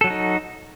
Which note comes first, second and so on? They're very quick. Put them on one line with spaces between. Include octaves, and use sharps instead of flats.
A4 F#3 F#4 D#4